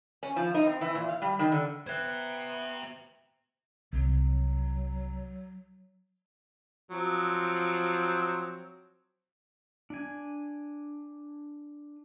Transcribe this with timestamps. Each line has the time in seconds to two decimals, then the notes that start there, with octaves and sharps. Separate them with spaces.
0.23 C#4
0.36 F3
0.54 D#4
0.67 C4
0.81 E3
0.95 A#2
1.09 F5
1.22 G3
1.39 D#3
1.52 D3
1.87 B3 C5 E5 F#6 G#6
3.93 C2 F#3
6.91 F3 F#3 C4
9.90 D4 G#5